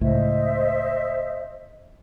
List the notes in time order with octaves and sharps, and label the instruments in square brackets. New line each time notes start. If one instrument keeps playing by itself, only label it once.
[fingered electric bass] C#2 A2 [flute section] C5 D#5 E5